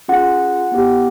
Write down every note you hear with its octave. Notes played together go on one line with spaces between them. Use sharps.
C#4 F4 G#4 F#5
B3 E4 G4